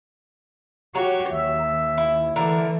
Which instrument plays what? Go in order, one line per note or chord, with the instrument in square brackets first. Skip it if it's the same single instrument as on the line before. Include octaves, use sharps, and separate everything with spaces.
[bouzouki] F#3 C#5 [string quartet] F#4 G4
[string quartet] D#2 [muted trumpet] E5
[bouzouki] E4
[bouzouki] D3 E4 A#4 [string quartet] E3 A3